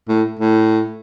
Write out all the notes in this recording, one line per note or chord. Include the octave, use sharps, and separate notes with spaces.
A2
A2